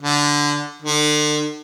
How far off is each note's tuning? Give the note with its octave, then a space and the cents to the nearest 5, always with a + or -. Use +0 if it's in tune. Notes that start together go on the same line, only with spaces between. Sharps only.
D3 -5
D3 +40